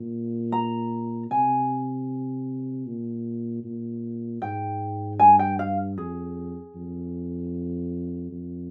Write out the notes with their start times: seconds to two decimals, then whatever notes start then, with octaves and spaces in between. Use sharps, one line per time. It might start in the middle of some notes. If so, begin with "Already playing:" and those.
Already playing: A#2
0.52 A#5
1.30 C3 G#5
2.86 A#2
3.64 A#2
4.42 G#2 G5
5.19 G2 G#5
5.39 G5
5.59 F5
5.97 F2 G#4
6.75 F2
8.31 F2